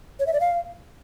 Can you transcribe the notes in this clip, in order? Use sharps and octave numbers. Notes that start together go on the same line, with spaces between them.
C#5
E5
D5
F5